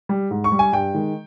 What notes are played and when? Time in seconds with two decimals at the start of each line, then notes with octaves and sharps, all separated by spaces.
0.09 G3
0.31 G#2
0.44 C#6
0.52 G3
0.59 G#5
0.73 G2 G5
0.94 D#3 G#3